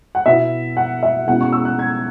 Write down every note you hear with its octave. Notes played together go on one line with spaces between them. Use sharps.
F#5
B2 B3 E4 E5
F#5
E5
B2 G#3 C#4 E4 F#5
C#6
E6
F#6
G#6